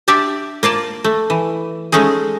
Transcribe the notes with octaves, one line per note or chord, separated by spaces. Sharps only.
D4 G4 D5 E5
A#3 F4 D5 A5
A3
E3
G#3 A3 C#4 D#4 G#4